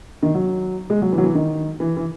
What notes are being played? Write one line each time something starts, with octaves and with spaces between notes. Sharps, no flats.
D#3
F#3
G#3
F#3
E3
F#3
E3
D#3
E3
E3